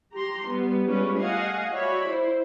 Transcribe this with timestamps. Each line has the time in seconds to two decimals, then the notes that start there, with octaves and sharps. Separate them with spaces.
0.12 G4 A#5 C6
0.49 G3 B3
0.86 G3 G#3 C#4 F4 G4 B4
1.18 A3 D#5 F5 F#5 G#5
1.73 F#4 C#5 D5 E5 B5
2.08 E4 C5